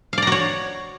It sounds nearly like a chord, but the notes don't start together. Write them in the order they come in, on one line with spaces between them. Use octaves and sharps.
F5 D5 A#5 F#4 C#5